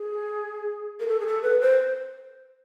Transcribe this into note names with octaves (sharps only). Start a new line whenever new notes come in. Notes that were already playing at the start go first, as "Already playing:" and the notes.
Already playing: G#4
A#4
A4
G#4
A4
B4
C5